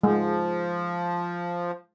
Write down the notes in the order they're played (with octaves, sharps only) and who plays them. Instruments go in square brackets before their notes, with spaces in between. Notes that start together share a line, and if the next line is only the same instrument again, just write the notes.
[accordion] F3 [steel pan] G#3